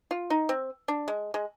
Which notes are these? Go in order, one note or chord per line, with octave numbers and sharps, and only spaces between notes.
F4
D#4
C4
D4
G#3
G#3